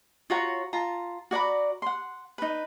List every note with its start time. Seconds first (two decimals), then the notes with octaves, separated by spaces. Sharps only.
0.30 F4 F#4 C#5 A#5
0.73 F4 A5 A#5
1.31 F#4 D5 A#5 B5
1.82 F#5 C6
2.38 D#4 B4